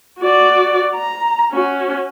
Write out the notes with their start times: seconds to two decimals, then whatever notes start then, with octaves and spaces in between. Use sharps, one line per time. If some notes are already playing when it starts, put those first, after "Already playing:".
0.19 F#4 D5
0.95 A#5
1.52 C#4 F#4